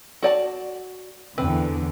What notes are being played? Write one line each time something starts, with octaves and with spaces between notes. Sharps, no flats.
F#4 D5 A5
E2 D3 E3 C4 B4